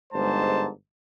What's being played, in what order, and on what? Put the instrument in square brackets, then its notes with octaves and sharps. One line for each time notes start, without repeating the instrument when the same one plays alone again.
[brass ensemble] G1 G#2 G#3 C5 A5